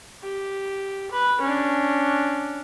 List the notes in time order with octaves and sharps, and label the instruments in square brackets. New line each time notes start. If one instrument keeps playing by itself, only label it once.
[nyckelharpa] G4
B4
C#4 D4